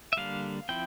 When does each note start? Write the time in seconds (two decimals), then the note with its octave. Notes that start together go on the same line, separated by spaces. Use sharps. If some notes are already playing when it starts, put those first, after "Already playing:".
0.13 E5
0.17 D3 G3 A#3 D4 F5
0.69 F3 C4 E4 G5